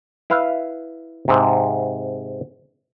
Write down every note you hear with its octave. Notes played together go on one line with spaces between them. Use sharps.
E4 B4 F5
G#2 C3